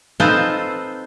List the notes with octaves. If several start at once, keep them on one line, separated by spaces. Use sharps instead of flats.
C4 D#4 F4 A4 B4 C5